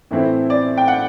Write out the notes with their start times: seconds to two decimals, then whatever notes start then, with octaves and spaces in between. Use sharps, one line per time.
0.11 A2 E3 A3 C4 E4
0.50 D5
0.78 G5
0.88 F#5